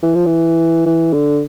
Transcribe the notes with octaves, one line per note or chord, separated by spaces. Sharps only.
E3
F3
E3
E3
D3